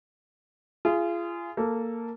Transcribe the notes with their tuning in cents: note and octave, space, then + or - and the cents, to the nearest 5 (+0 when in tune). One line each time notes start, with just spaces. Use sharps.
F4 -30 G#4 +0
A#3 -10 A4 +0